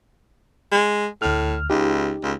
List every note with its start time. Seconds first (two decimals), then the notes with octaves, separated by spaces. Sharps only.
0.72 G#3
1.22 D2 A2 F6
1.70 C#2 D#4 G4
2.23 C#2